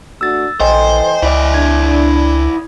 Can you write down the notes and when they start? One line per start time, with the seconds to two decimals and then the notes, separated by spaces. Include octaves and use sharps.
0.21 A3 D4 F#4 E6 A6
0.60 A#1 E3 A4 C5 D#5 G5 G#5
1.22 C#2 E4 D5
1.54 D4 G#6